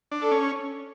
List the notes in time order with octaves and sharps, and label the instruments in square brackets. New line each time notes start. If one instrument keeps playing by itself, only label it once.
[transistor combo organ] D4
[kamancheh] A4
[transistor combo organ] C#4